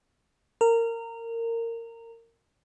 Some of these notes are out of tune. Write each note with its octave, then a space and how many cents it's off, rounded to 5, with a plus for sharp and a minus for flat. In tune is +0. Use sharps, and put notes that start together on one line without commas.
A#4 -20